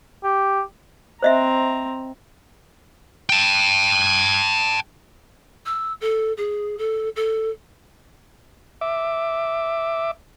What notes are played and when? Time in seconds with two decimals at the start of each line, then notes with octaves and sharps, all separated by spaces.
0.24 G4
1.22 C4 C5 D#5 E5 A#5
3.30 G5 A5
5.65 E6
6.00 A4
6.37 G#4
6.78 A4
7.16 A4
8.81 E5 D6